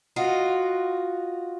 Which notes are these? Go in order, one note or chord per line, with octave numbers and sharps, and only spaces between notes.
F4 F#4 D#5